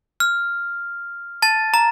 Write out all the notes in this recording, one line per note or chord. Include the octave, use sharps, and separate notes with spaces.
F6
A5 A6
A#5